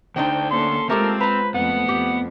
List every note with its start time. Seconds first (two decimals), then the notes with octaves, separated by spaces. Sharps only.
0.16 D2 D3 D4 D#4 C5 G5
0.51 A#3 C#4 A4 C6
0.89 G#3 A3 C4 F4 G4 A4 A#4
1.20 B4 C5 A#5
1.55 F2 A3 B3 F#5
1.89 F2 G4